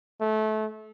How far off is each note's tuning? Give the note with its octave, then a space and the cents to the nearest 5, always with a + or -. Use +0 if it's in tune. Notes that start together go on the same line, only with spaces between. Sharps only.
A3 -25